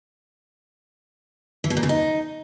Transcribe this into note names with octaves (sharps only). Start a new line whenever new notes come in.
E3
B2
A#2
C#3
D#4